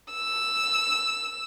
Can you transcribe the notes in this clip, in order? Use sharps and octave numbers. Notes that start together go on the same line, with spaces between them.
E6